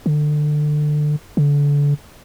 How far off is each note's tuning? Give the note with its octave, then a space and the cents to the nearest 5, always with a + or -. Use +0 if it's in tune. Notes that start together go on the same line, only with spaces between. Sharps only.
D3 +25
D3 -30